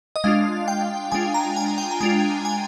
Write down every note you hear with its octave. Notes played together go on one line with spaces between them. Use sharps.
D#5
G#3 D4 F4 F5
G5
G#3 D4 F4 G#5
A#5
G#5
G5
A#5
G#3 D4 F4 G#5
G#5